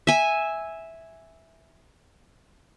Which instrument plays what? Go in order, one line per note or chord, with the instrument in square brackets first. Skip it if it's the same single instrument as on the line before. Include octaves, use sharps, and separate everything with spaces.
[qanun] E5 G#5